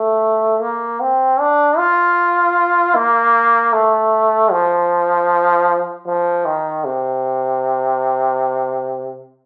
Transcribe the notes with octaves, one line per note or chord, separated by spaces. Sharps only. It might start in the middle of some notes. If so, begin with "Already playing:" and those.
Already playing: A3
A#3
C4
D4
F4
A#3
A3
F3
F3
D#3
C3